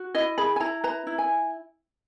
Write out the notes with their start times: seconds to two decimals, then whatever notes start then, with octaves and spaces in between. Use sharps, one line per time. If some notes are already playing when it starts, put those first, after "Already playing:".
Already playing: F#4
0.15 E4 D#5
0.38 G#4 B5
0.56 G#5
0.60 E4 A#5
0.84 B4 A#5
1.07 E4
1.18 G#5